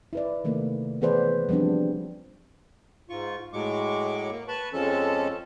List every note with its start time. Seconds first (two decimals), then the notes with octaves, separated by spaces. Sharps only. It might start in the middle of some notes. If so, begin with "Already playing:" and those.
0.13 E4 B4 D5
0.44 C3 D#3 A3 A#3
1.01 E3 B3 G#4 B4 C5 D5
1.49 F3 G3 B3 C4 D4
3.09 G#2 F4 C#6
3.53 A2 F#3 G#3 C#6 D6
4.31 A#3
4.48 B4 A5 B5 C#6
4.73 F2 F3 G#3 C#4 A4 A5